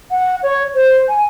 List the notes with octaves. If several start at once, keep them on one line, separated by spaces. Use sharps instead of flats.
F#5
C#5
C5
G#5